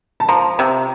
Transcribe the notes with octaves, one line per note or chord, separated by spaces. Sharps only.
A5
F3 A#5
C3